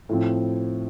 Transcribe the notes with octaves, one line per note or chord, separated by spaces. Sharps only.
A2 F3 C4